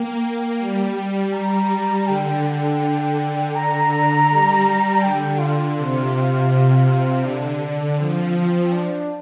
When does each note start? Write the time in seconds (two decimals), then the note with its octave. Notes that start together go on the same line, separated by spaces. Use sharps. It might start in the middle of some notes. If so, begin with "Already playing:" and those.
Already playing: A#3 G5
0.59 G3
1.33 A#5
2.07 D3 G5
2.44 G5
3.55 D3 A#5
4.29 G3
5.03 D3 G5
5.39 F4
5.77 C3
7.25 D3 D4
7.98 F3 C4
8.73 D4